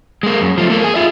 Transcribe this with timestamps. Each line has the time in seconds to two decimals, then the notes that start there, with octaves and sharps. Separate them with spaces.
0.23 G#3 A#3
0.41 F#2
0.58 F3 A3
0.70 A3 A#3
0.84 G#4
0.95 F4 E5